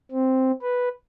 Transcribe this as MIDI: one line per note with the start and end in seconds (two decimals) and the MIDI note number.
0.11 0.51 60
0.62 0.89 71